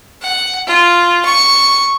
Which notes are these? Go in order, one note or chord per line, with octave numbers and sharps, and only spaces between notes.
F#5
F4
C#6